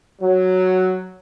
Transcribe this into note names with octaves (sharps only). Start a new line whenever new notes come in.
F#3